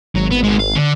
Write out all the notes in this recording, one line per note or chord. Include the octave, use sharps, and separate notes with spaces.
G#1 F#3
B3
G#3 B3
F5
D3